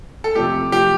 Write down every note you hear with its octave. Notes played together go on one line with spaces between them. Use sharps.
A4
F2 C3 F3 A3 G4
F2 C3 F3 A3 G4